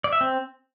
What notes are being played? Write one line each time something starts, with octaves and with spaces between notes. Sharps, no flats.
D5
E5
C4